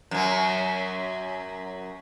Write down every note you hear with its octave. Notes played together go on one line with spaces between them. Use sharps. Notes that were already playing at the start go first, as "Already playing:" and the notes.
F#2 F#3